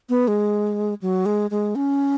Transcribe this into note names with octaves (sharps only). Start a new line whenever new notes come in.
B3
G#3
F#3
G#3
G#3
C#4